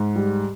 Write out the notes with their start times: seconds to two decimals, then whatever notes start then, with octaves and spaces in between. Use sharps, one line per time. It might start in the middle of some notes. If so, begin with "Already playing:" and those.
Already playing: G#2
0.16 G3